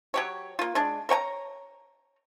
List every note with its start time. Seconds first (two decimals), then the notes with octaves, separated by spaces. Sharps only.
0.14 F#3 G4 C#5
0.59 A#3 F4
0.75 G#3 D4
1.09 A#4 C#5 G5 A#5